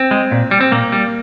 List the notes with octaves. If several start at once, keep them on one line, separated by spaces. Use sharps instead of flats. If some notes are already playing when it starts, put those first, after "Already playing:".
Already playing: C4
G#3
A#2
G3
C4
A#2 A#3
G3